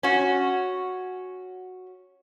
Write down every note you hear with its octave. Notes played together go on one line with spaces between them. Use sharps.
C#4 F#4